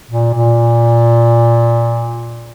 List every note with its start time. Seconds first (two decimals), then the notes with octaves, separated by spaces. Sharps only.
0.10 A#2
0.34 A#2